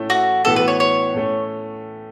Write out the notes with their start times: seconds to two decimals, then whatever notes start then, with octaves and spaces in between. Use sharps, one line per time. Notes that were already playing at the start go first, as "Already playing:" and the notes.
Already playing: A2 A3 C#4 E4
0.10 F#4
0.45 A2 E3 B3 F#4 A4
0.56 B4
0.68 C#5
0.80 C#5
1.14 A2 A3 C#4